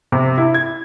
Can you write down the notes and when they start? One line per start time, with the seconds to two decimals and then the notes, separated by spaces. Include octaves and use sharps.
0.12 C3
0.38 E4
0.54 G#6